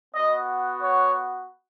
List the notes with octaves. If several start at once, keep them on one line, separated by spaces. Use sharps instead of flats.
B3 F#4 D#5
C#5